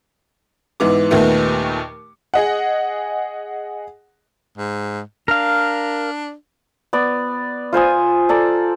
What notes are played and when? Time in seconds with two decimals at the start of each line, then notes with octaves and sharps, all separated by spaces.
0.80 G#2 E3 B3 D6
1.11 D#2 A#2 D#3 A3 B3
2.34 G#4 D#5 F#5
4.58 G#2
5.28 D4 A#4 F5
6.93 B3 D5
7.73 F4 C5 G#5 D#6
8.29 A4 D5 A#5